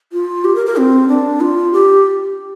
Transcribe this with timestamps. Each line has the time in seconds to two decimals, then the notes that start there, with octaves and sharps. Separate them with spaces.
0.13 F4
0.45 G4
0.55 A#4
0.66 A#4
0.77 C4
1.08 D4
1.41 F4
1.73 G4